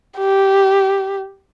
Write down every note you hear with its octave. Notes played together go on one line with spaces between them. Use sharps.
G4